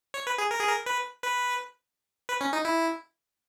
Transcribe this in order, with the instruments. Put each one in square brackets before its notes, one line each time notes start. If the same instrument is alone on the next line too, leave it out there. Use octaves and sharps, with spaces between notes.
[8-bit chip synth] C#5
B4
G#4
A#4
G#4
A#4
B4
B4
B4
C#4
D#4
E4